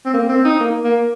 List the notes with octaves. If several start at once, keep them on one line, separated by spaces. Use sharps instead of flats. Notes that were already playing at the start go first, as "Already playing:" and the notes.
C4
A#3
C4
D#4
A#3
A#3